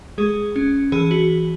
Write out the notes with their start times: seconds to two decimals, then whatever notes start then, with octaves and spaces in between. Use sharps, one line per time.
0.18 G#3 G#4
0.56 C#4
0.92 E3 G#4
1.11 F#4